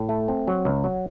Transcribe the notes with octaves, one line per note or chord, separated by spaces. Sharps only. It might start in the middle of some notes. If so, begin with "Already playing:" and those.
Already playing: A2
A3
C4
F#3
C#2
F#3